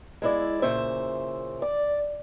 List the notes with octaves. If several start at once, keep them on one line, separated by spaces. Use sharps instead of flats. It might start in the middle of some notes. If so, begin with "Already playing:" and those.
G#3 E4 D5
A#2 C#3 C5 E5
D5